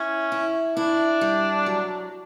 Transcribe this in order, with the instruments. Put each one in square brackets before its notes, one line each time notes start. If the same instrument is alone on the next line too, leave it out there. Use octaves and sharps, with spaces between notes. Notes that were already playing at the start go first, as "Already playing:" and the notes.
Already playing: [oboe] C#4 [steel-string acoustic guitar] E4
[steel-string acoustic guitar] E4
[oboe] D4 [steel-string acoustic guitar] E4
[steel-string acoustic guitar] G3
F#3